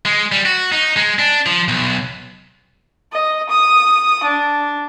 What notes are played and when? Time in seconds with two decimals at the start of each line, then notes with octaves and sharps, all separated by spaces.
0.05 G#3
0.32 G3
0.46 F#4
0.72 D#4
0.97 G#3
1.19 D4
1.46 F3
1.68 B1
3.13 D#5
3.49 D#6
4.23 D4